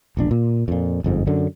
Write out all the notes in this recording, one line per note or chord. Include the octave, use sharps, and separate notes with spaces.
E1 A#1 D4
A#2
F2 A#2
G1 F2 G#2
F#2 D3